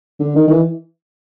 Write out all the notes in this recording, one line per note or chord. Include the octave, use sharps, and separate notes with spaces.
D3
D#3
D#3
E3